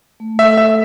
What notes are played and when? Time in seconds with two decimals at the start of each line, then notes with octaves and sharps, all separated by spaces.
0.20 A3
0.39 E5
0.45 A4
0.58 E5